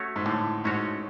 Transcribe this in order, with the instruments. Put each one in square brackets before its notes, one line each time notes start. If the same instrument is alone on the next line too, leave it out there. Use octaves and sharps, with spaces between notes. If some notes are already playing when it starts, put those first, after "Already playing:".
Already playing: [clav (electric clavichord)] A3 C#4 F#4 C#5
[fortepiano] G#2
[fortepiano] A2 [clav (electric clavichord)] D3
[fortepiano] G#2 [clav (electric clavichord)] A3 C#4 F#4 C#5